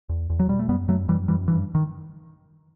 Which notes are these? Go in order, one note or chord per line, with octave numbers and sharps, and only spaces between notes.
E2
E2
F#3
B2 G3
A3
F#2 G3 B3
F#2 F#3 A3
F#2 E3 G3
F#2 E3 G3
G2 E3
D#3